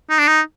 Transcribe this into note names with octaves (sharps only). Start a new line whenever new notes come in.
D#4
D4
D#4